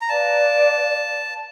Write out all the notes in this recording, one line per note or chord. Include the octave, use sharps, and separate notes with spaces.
A#5
B4 D5 F5 A5